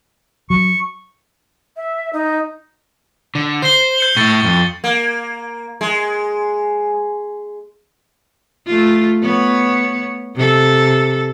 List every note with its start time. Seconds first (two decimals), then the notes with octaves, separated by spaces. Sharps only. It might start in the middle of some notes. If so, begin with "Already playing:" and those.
0.50 F#3 C#6
1.76 E5
2.13 D#4
3.35 D3
3.62 C5 C7 G7
3.98 G6 C#7 F#7
4.17 A2 E4 C#6 A6 C#7
4.45 F2
4.84 A#3
5.81 G#3
8.66 A3 F4
9.22 B3 C#5
10.35 C3 A4